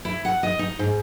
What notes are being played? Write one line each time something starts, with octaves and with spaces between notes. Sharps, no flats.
E4
F#5
D#5
D#4
G#2